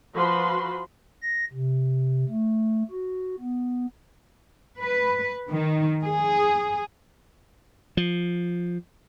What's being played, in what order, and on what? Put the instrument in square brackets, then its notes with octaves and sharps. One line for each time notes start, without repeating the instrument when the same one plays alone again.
[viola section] F3 F#4 B4 C5 B5 C6
[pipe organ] A#6
C3
A3
F#4
B3
[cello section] B4
D#3
G#4
[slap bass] F3